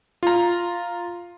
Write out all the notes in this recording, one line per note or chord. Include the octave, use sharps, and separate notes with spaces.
F4 A#5